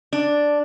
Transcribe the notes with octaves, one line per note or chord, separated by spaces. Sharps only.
D4